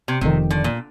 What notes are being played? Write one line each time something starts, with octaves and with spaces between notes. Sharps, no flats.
C3
F1 F2 C3 D#3
D3
A#2